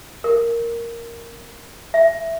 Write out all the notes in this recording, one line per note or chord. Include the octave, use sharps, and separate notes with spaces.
A#4
E5